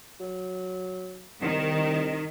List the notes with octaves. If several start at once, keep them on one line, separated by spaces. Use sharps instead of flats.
F#3
C2 D#3